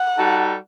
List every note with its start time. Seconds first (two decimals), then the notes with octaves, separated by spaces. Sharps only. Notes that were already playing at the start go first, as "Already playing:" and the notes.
Already playing: F#5
0.16 G3 D#4 F#4 A4